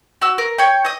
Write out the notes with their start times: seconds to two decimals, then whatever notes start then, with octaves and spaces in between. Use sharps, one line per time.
0.22 F#4 E6
0.38 A#4
0.58 C#5 G5
0.85 D#5 D#6